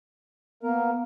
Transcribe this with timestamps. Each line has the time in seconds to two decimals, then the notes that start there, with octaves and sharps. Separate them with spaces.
0.63 A#3 B3 A#4